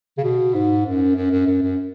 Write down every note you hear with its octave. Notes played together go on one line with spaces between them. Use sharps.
C#3
B2
G#2
F#2
F#2
F#2
F#2
F#2